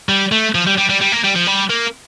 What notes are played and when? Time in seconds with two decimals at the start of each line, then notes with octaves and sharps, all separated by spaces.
0.09 G3
0.32 A3
0.55 F3
0.67 G3
0.78 G3
0.89 G3
1.01 G3
1.12 A#3
1.24 G3
1.35 F3
1.47 G3
1.70 A#3